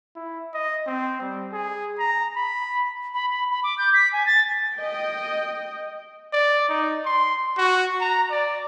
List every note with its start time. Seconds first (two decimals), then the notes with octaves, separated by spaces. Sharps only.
0.16 E4
0.54 D#5
0.86 C4
1.21 G3
1.53 G#4
1.99 A#5
2.36 B5
3.14 B5
3.30 B5
3.51 B5
3.63 D6
3.78 G6
3.94 B6
4.13 G#5
4.26 A6
4.75 D#5 G5
6.33 D5
6.69 D#4
7.05 C6
7.57 F#4
8.00 A#5
8.31 D5